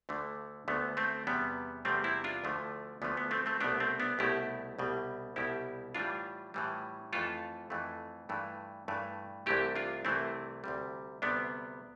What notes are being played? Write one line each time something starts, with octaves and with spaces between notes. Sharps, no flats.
D2 D3 A3
D2 D3 A3 B3
A3 C4
E2 C3 G3 B3
E2 C3 G3 A3 C4
C4 E4
D4 F4
D2 D3 F3 A3
D2 D3 F3 A3 B3
B3
A3 C4
A3 C4
C2 B2 A3 B3 D4
A3 C4
B3 D4
C2 B2 A3 E4 G4
C2 B2 G3
C2 B2 G3 E4 G4
A2 E3 G3 D4 F4
A2 E3 G3
F2 E3 A3 F4 A4
F2 E3 A3
G2 E3 A3
G2 E3 A3
C2 C3 E3 A3 E4 G4
D4 F4
C2 C3 E3 A3 C4 E4
D2 C3 G3
D2 C3 G3 B3 D4